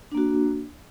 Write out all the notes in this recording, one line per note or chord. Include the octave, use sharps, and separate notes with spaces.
A#3 D4 F#4